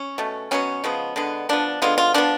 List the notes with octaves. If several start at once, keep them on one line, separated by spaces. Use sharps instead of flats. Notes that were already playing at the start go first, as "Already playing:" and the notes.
Already playing: C#4
B2 A3
B2 F#3 B3 C#4
C#3 F3 G#3 B3
D3 G#3 B3
F3 B3 D4
D3 G#3 B3 F4
F4
F3 B3 D4